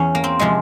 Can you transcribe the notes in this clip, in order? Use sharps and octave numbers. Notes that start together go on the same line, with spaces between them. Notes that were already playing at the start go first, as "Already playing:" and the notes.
Already playing: E2 C#4
A#3
C4
C3 F3 G#3